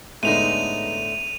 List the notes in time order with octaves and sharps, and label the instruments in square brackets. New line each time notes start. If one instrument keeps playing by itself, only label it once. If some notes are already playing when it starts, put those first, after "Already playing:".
[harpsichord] A2 D3 [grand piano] G#3 B3 D#4 [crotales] D#7 F7